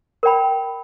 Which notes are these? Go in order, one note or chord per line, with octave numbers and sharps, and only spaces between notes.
A#4 D5 G5 B5